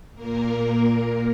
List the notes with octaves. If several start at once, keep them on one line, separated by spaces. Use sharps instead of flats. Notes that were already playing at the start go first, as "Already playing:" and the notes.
A#2 A#3 A#4
A#4